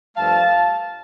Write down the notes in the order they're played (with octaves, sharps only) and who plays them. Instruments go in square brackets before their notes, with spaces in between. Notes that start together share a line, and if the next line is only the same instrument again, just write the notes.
[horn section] G2 F3 A3 F5 A5